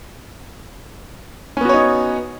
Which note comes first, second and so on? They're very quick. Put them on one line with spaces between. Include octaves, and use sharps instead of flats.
C#4 B3 F#4 C#5 D#4